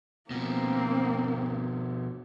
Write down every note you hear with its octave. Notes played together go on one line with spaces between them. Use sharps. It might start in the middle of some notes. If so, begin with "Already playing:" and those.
B2 F3 A#3 C4